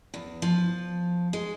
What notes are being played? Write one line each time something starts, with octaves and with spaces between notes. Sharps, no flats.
E2
F3
G#3